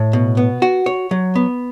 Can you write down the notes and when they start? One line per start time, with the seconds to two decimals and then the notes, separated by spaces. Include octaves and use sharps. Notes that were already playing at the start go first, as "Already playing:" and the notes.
Already playing: A2
0.13 B2
0.37 B3
0.62 F#4
0.86 C#5
1.11 F#3
1.35 B3